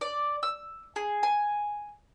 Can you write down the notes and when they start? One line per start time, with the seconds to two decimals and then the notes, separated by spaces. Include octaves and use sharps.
0.01 D5
0.43 E6
0.96 G#4
1.23 G#5